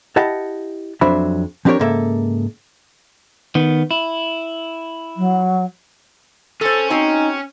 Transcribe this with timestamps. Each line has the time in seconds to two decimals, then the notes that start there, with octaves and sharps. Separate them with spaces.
0.16 E4 G4 D#5 F#5 A5
1.01 F2 F#3 D4 C5 E5 B5
1.65 F3 C4 D4 G4 A#4 C#5
1.79 G#2 C#3 A#3 A4 E5
3.55 D#3 B3
3.91 E4
5.17 F#3
6.61 C#4 A4 C5
6.90 C4 D#4 F#4 G#5